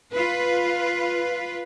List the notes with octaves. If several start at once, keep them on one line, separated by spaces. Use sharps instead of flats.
F4 B4